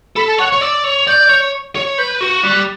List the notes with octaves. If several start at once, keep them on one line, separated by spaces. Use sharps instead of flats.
A4 B5
A5
C#5 F#5
C#6
C#5
D5 E6
C#5
D5 G6
C#5
C#5
B4 G6
F#4
G3 F#6